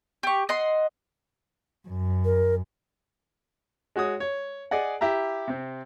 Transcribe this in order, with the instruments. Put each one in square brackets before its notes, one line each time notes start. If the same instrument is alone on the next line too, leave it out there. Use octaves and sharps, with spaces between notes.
[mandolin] G4 C#6
D#5 F#5 C6
[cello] F#2
[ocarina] A#4
[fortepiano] G#3 F#4 C#5 D#6
C#5
G#4 D5 D#5 F#5
E4 G4 E5 A#5
C3 C4